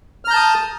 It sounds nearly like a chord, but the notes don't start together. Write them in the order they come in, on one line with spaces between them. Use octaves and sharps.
F6 A#5 G6 A5 D#6